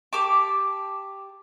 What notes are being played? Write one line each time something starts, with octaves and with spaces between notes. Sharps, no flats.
G4 A5 C#6 D6